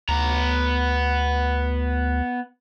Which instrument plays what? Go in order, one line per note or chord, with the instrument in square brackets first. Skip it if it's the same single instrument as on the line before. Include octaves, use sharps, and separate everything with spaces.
[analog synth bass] D2 [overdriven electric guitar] B3 A#5